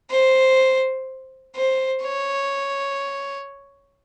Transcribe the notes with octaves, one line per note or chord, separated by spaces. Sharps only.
C5
C5
C#5